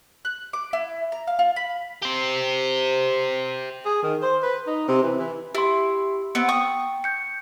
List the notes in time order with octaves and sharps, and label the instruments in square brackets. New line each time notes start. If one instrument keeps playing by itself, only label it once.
[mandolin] F#6
D6
E4
A#5
F5
F4
B5
[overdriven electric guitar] G4 C5
[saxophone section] G#4
D#3
C5
B4
D#4
C3
E3
E3
[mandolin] E4 [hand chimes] G4 C6
[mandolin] B3 C4 [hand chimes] C#7
[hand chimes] G5 [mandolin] C#6 D#6
[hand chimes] G6 C#7